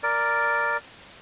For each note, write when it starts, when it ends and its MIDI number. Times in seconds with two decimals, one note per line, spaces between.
0.03 0.77 70
0.03 0.77 74